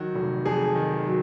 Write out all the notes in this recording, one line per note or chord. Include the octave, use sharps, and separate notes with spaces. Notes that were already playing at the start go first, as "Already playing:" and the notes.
Already playing: D#3 F#3 F#4
F1
F2 G#4
D#3
F#3